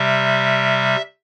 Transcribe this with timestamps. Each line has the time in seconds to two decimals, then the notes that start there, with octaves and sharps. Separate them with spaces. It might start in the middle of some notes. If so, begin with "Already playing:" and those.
Already playing: C3 G3 E5